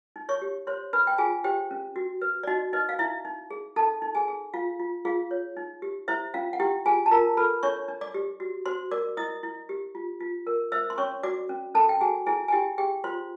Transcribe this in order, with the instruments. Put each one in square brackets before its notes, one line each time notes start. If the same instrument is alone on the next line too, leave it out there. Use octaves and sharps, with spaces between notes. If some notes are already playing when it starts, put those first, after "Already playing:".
[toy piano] D#4
C#5 C#6
G4
C5 C#5 C6
D4 B4 B5
G5
F4 G#4 G#5
G4 C5 G5
C#4
F#4
B4
D5
D#4 F#4 D#5
D#4 B4 D#5
F5
D#4 E4 E5
D#4
G#4
D#4 A4 A5
D#4
G#4 G#5
G#4
F4 F5
F4
F4 G#4 F5
C#5
D#4
G4
E4 C5 E5
C#4 F4 F5
F#5
E4 G4 G5
F4 G#4 G#5
A5
F4 A#4 A#5
A4 B4 B5
D4 C#5 C#6
D4
D5 D6
G4
F#4
F#4 C5 C6
A#4 D5 D6
E4 D#5 D#6
E4
G4
F4
F4
A#4
C5 E5 E6
C6
C#4 C#5 C#6
F#4 D5 D6
C#4
C#4 A4 A5
G5
F#4 G#4 G#5
E4 G#4 G#5
G#5
E4 G4 G5
G4 G#4 G5
F4 C5 C6